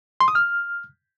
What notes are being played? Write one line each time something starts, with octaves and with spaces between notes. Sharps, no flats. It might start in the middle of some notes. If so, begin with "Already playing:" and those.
C6
D#6
F6